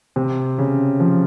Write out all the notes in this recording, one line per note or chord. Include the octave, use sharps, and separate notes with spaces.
C3
C#3
F3